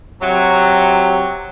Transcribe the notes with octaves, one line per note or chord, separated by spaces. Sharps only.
C3 F#3